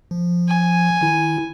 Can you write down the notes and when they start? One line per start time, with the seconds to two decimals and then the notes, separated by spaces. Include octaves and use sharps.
0.11 F3
0.48 G#5
1.01 D#3 E4